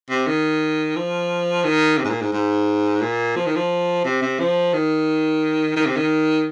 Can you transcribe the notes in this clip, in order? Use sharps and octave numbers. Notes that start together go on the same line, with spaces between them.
C3
D#3
F3
D#3
C3
G#2
A#2
G#2
G#2
A#2
F3
D#3
F3
C3
C3
F3
D#3
D#3
C3
D#3